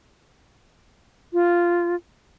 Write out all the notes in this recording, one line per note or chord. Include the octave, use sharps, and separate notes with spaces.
F4